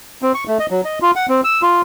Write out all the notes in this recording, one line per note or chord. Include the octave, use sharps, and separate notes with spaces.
C4
C#6
A3
D#5
F#3
D#5
F4
F#5
C4
E6
F4